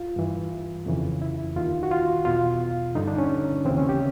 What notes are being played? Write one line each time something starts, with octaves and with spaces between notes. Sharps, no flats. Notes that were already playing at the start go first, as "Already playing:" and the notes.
Already playing: F4
G2 E3
F2 C#3 E3
E4
D#2 D#3 F4
F#4
F4
E2 B2 F4
G2 D3 D#4
D4
C#4
D#2 C#3 E3 C4
C#4
G4